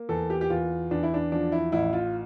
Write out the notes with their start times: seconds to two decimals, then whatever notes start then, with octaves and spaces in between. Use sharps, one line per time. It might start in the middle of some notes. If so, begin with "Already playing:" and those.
Already playing: A#3
0.09 E2 A4
0.30 G4
0.41 G4
0.50 E2 F4
0.91 E2 D4
1.03 E4
1.14 D4
1.32 F3 D4
1.52 E4
1.72 A1 E4
1.93 F4